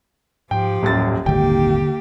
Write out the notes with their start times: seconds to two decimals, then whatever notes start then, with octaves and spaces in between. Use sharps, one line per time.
0.51 G#2 F3 G4 G5
0.83 D#1 F#2 A2 A6
1.26 D#1 G#1 D3 A#3 G4 G5